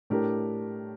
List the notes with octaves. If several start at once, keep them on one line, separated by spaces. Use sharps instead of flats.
A2 A3 D4 G4 A#4